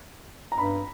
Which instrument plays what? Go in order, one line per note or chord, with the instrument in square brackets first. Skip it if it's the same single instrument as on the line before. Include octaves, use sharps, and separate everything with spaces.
[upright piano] A#5
[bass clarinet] G2 [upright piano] B5